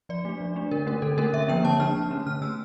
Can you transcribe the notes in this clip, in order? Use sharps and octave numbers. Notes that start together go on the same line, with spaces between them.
F3 D5
A3 D4
F3
A3 D4
D3 A#4
A3 C#4 A#4
D3 A4
A3 C#4 A#4
D3 E5
F3 A#3 D4 G5
D3 A5
F3 A#3 D4 F6
D3
A3 C#4
D3 F6
A3 C#4 E6